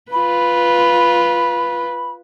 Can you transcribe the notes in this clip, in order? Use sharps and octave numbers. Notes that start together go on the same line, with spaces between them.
F4 B4 B5